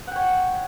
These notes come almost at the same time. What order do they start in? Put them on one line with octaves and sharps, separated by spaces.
F#5 G5 C#5